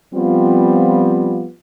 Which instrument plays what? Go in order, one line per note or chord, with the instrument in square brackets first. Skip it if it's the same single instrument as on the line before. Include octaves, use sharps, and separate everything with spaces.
[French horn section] F3 G3 B3 C4 F4